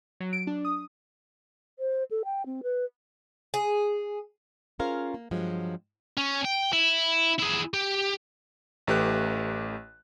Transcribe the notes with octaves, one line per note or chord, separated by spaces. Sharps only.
F#3
D7
D4
D#6
C5
A4
G5
C4
B4
G#4
C#4 F4 G#4 A#4 C5 F5
A#3
G2 F3 F#3 G#3
C#4
G5
E4
E4 G#4
G4
A1 A3 G4 B4 F#6